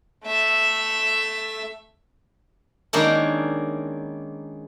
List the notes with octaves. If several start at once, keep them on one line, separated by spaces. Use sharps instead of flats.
A3 E5
D#3 G#3 A#3 C#4 D4 E4